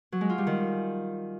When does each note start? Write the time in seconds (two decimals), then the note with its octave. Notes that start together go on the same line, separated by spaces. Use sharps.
0.12 F#3
0.21 G#3
0.30 F4
0.38 G3
0.47 D#3